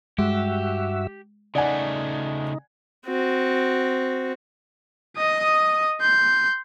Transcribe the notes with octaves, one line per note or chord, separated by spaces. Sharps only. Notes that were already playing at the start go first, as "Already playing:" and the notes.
G2 G#3 F#4 G4 E5
C#3 A3 D#4 D5 F#5 G#5
C4 F#4
D#5 D#6
C6 G6